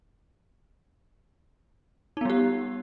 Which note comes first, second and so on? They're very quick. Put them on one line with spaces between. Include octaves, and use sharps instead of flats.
D#4 B3 G3 G4